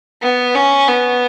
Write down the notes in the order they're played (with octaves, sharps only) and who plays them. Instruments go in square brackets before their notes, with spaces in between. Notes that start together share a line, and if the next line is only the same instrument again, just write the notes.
[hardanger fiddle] B3
C#4
B3